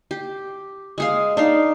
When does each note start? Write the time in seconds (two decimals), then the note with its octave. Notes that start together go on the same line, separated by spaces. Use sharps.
0.11 G4
0.98 G#3 G#4 F5
1.37 D4 D#4 F5